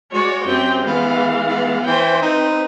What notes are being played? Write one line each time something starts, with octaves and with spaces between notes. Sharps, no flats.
G#3 F#4 C#5 D5
F#2 C4 G4 G5
E3 G#3 B3 F5
B3
E3 C#4 C5 G5
C4 D#4 B4